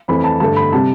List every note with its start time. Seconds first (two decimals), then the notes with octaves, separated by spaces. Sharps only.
0.08 F2 E3 A3 B5
0.24 A5
0.40 G2 D3 A3 A5
0.56 B5
0.73 C3 G3 A5